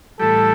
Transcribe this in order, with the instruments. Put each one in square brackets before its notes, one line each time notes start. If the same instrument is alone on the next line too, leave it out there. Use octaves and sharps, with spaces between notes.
[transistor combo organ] A2 E3 G3 [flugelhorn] A4